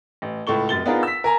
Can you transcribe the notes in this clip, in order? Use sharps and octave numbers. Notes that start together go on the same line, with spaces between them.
A1
C#2 A2 A4 C#6 G7
F1 F#2 A6 G7
B3 D4 D#4 F4 G#4 A#4
E6 B6
A#4 G#5 A#5